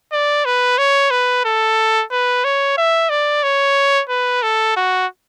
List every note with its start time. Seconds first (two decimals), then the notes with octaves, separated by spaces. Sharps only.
0.12 D5
0.45 B4
0.78 C#5
1.11 B4
1.45 A4
2.11 B4
2.44 C#5
2.77 E5
3.10 D5
3.43 C#5
4.09 B4
4.42 A4
4.76 F#4